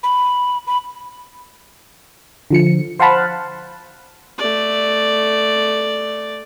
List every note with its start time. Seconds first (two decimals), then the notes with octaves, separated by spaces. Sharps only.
0.03 B5
0.67 B5
2.51 D3 F3 C#7
3.00 C5 F5 F#5 A5 B5
4.38 A3 D5